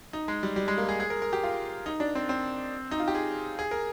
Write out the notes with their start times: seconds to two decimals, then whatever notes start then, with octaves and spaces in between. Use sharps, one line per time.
0.13 D#4
0.28 G#3
0.43 G3
0.56 G3
0.68 G#3
0.78 A#3
0.89 G#4
1.00 G#4
1.10 A#4
1.22 A#4
1.33 G4
1.43 F4
1.86 D#4
2.00 D4
2.15 C4
2.29 C4
2.91 D#4
3.00 F4
3.08 G4
3.15 G#4
3.59 G#4
3.71 A#4